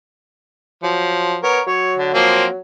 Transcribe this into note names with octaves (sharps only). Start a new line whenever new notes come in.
F3 F#3
B3 A#4 C#5
F#3 C#5
D3
F3 A#3 C4